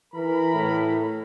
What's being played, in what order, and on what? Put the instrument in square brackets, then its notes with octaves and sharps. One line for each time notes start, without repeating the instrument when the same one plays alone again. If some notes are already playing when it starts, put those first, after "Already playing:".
[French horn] E3 [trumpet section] A#4 B5
[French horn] A2